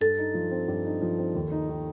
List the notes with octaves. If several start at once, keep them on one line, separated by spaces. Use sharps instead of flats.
G2 A4
D#4
F3
C4
G2
D#4
F3
C4
D#2
D#4
D#3